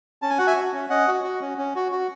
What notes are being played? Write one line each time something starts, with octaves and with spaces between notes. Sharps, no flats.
C#4 A5
G#5
F#4 F#5
E5 G#5
F#4
C#4
C#4 D#5 F#5
F#4
F#4
C#4
C#4
F#4
F#4